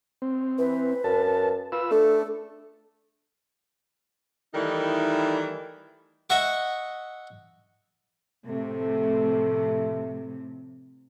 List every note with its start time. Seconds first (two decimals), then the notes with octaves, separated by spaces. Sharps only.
0.22 C4
0.58 E3 B4
1.04 F#2 A5
1.72 F4 B4 E6
1.91 A3 D4 A4
4.54 D#3 E3 G3 A3 D#4 E4
6.30 D#5 E5 F#5 C#6
8.46 A2 C3 F3 A3